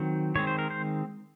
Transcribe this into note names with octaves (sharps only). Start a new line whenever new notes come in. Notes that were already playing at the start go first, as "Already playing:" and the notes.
Already playing: D#3 F#3 C4
D#3 G#3 C4 C#5
C5
A#4
C5